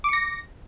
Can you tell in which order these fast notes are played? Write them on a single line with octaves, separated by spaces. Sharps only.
D6 C#7 A#6